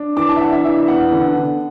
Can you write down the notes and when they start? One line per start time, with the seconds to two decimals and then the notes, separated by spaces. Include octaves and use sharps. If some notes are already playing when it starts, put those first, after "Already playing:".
Already playing: D4
0.17 E3 D6
0.29 A5
0.36 E5
0.41 D4 F#5
0.52 E5
0.64 E3 E5
0.88 B3 F#5
1.12 D3
1.35 D3